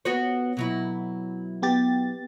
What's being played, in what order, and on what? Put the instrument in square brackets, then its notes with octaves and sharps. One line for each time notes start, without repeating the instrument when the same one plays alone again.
[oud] B3 F#4 C#5
B2 F#3 E4
[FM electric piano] B3 G4 A6